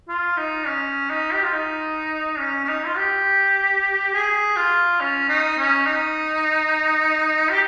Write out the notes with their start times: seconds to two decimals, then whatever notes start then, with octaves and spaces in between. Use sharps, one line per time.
0.09 F4
0.37 D#4
0.67 C#4
1.10 D#4
1.33 G4
1.43 F4
1.53 D#4
2.39 C#4
2.64 C#4
2.69 D#4
2.86 F4
2.97 G4
4.14 G#4
4.57 F4
5.01 C#4
5.29 D#4
5.58 C#4
5.86 D#4
7.50 G4